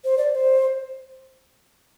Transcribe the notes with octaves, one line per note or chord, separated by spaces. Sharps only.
C5
D5
D5
C5